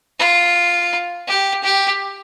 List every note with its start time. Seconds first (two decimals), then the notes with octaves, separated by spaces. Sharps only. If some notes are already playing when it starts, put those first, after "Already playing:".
0.19 F4
1.28 G4
1.64 G4